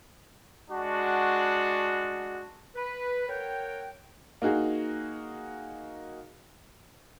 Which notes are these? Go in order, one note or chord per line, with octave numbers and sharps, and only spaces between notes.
G#3 D4 F#4
B4
A#4 C#5 F#5 G5
A#3 D#4 F#4 G#4